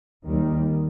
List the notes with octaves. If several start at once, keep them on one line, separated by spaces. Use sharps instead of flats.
D#2 D#3 G3